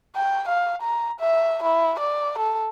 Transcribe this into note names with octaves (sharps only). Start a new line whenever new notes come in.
G5
F5
A#5
E5
E4
D5
A4